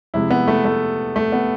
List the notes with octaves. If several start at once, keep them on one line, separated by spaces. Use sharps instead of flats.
F2 C3 G#3 E4
B3
A3
A3
A3
B3